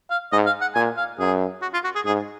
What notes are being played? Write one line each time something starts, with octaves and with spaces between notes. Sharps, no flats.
F5
G#2 D#5
F5
F#5
A#2 G#5
F5
F#2 G#4
F#4
F4
F#4
G#4
G#2 G#4